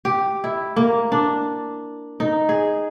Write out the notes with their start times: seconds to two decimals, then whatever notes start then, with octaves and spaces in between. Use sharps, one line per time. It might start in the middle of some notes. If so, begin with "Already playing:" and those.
0.05 G4
0.44 E4
0.76 A#3
1.12 D4
2.20 D#4
2.49 G#4